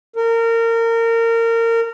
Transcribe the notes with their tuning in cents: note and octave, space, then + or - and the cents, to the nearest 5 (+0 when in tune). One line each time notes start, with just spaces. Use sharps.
A#4 -25